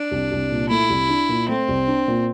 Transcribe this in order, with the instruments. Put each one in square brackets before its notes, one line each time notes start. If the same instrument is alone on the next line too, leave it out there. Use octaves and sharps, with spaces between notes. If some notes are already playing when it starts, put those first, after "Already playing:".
Already playing: [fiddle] D4
[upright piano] C2
C2
A#2
[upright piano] A3 [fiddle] E4
[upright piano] C2
D4
A#2
[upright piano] A3 [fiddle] C4
[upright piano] C2
D4
A#2